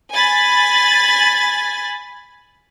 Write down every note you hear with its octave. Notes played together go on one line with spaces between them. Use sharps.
G#5 B5 A6